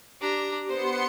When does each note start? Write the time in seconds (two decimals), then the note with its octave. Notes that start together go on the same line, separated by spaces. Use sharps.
0.21 D4 G4 A#5
0.68 B3 C5 C6 C#7